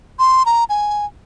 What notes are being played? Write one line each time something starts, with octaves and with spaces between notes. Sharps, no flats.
C6
A#5
G#5